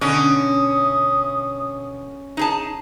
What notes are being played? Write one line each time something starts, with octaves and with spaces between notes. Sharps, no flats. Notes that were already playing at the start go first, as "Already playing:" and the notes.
B2 D3 C#4 D#6
D#4 G#4 A5